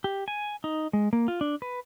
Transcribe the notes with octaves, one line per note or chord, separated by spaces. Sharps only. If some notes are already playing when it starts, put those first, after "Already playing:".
G4
G#5
D#4
G#3
A#3
F4
D4
B4